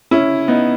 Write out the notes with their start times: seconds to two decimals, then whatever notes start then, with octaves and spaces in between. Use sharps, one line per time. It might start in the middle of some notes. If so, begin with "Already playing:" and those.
0.11 C#4 E4
0.48 B3 D#4